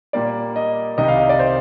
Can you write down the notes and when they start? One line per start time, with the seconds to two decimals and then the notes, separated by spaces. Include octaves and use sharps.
0.13 A#2 G3 A#3 D5
0.56 D#5
0.98 C2 C3 D#3 G3 D#5
1.08 F5
1.19 D#5
1.29 D5
1.39 C5